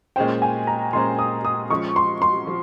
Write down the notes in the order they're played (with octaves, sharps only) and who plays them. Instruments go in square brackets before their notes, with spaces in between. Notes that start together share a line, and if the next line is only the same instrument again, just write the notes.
[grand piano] A#2 G#3 C#4 G#4 C5 [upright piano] G5
[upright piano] G#5
A#5
[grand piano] A#2 G#3 C#4 G#4 C5 [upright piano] C6
[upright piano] D#6
D#6
[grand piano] F3 G#3 C#4 [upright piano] C#6
[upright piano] C6
C6
[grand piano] F3